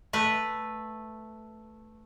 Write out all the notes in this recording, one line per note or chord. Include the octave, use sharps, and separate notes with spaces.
A3 B4